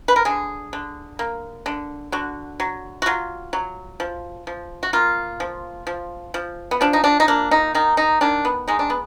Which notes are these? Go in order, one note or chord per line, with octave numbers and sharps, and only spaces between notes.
B4
A#4
D3 G#4
D3
A#3
D3
D3 F#4
F#3
F#4
F#3 F4
F#3
F3
F3
F#4
A#3 F4
F3
F3
F3
B3
F3 D4
D#4
D4
D#4
A#3 D4
D#4
D#3 D#4
D#4
D#3 D4
B3
G#3 D#4
D4
B3